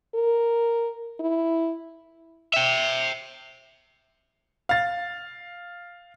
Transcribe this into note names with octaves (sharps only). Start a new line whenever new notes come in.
A#4
E4
E5 G5
F5 A6